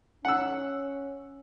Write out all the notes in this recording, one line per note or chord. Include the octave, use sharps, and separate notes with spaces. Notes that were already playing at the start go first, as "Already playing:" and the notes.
C#4 F#5 E6